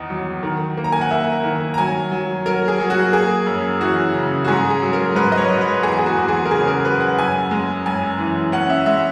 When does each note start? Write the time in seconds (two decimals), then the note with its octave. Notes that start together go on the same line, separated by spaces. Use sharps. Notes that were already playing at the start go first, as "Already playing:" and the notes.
Already playing: E2 D#3 B3 D#5
0.10 F#3
0.43 D#3
0.77 A#3
0.84 A#5
0.92 G#5
1.01 F#5
1.11 A#3 E5
1.44 D#3
1.74 A#5
1.78 F#3 G#5
2.12 F#3
2.46 F#3 A#4
2.68 G#4
2.80 F#3
2.90 F#4
3.13 A#3 G#4
3.46 F#2
3.80 E3 F#4
4.14 C#3
4.45 F#4
4.48 G#2 G#4
4.70 G#4
4.82 F#3
4.93 A#4
5.15 G#2 B4
5.32 D#5
5.37 C#5
5.49 F#3
5.61 B4
5.82 E2 G#4
5.99 G#4
6.06 F#4
6.17 E2
6.28 G#4
6.45 A#4
6.51 C#3 G#4
6.67 A#4
6.85 F#3 B4
7.01 F#5
7.19 F#2 G#5
7.51 G#3
7.86 F#2 G#5
8.19 E3
8.52 C#4 F#5
8.70 E5
8.86 G#3 E5